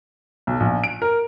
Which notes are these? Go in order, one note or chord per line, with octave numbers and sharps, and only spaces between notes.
B1
A#1
D7
A#4